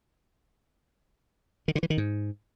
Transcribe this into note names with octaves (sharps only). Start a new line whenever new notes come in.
D#3
D3
E3
D#3
G#2